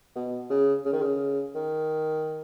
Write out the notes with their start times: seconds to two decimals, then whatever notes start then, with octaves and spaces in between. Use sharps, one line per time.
0.15 B2
0.49 C#3
0.85 C#3
0.93 D#3
1.02 C#3
1.55 D#3